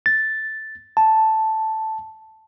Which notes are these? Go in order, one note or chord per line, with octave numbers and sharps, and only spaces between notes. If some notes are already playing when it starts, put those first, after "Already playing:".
A6
A5